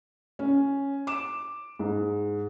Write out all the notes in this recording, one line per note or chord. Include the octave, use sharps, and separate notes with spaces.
C#4
D6 E7
G#2